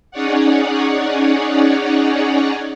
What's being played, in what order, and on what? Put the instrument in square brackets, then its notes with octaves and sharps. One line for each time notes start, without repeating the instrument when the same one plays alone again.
[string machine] C#4 D#4 G#4 C#5 D5 F#5